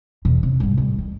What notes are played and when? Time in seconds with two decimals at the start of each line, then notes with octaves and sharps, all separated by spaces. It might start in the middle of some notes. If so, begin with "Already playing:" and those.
0.25 E2 B2
0.43 C3
0.60 G#2 G3
0.78 A2 G3
0.98 D#3